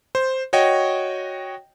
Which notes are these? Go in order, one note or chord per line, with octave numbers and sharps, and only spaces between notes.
C5
F#4 C#5 D#5 G5